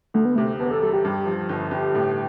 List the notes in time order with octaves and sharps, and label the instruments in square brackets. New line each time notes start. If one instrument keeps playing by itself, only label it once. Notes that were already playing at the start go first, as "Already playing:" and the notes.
[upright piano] D2 [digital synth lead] A3
[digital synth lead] B3
[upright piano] C3 [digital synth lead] A3
[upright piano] E1 [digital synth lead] B3
[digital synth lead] A4
[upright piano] G3 [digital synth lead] A4
[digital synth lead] G4
[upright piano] G2
F3
G1
[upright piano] G1 [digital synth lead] G4
[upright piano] A2